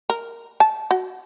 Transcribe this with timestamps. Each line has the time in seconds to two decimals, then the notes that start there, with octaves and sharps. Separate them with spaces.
0.10 A#4
0.60 A5
0.91 F#4